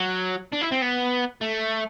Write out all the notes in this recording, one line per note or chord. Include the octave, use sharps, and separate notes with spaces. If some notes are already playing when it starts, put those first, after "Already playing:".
Already playing: F#3
D4
E4
C4
B3
A3